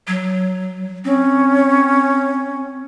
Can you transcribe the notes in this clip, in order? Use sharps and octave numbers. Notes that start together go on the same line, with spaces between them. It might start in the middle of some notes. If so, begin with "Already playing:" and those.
F#3
C4 C#4